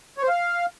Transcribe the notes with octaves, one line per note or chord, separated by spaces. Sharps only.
C#5
C5
F5